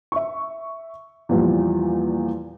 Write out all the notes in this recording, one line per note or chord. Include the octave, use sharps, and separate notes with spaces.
E5 C#6
E2 A#2 E3 F3 G3